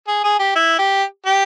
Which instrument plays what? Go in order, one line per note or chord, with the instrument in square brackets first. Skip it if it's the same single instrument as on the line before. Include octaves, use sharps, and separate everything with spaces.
[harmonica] G#4
G#4
G4
E4
G4
G4